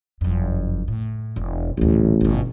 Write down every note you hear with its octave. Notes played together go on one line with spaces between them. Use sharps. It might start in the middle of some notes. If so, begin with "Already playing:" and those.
F#1 F2
A2
E1
D#1 A1 D2
G1 B2